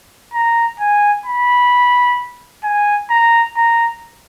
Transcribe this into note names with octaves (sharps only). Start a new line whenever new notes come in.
A#5
G#5
B5
G#5
A#5
A#5